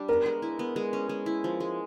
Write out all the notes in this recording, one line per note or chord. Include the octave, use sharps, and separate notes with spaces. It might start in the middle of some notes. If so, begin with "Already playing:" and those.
Already playing: G3 D4
B3 A#4
G#3
E4
B3
G#3
C#4
G#3
E4
F3
G#3